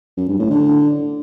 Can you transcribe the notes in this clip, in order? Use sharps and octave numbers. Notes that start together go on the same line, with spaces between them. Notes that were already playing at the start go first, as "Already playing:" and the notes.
F#2
G2
A2
D3